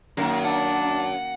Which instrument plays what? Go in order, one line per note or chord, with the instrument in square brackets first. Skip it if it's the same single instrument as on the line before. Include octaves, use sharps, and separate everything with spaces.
[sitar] F#2 [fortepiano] D#3 A#3 A#5
[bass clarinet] D4 [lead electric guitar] F#5